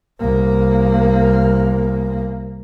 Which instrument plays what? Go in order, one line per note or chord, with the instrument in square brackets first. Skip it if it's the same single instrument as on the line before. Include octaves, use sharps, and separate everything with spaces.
[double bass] C2 A#3